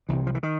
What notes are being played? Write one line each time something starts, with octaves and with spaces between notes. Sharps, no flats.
C2 C3 E3
F3
E3
D#3